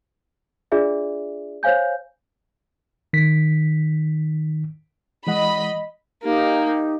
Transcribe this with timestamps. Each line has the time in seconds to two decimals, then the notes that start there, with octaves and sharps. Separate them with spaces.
0.72 D4 F4 G#4 D5 E5
1.63 C5 C#5 F5 G#5 G6
3.13 D#3 B6
5.27 E3 G#3 D#5 F#5 B5
6.23 A#3 D#4 G4